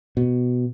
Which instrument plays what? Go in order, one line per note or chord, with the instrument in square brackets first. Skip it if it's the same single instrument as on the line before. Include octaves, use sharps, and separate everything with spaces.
[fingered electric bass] B2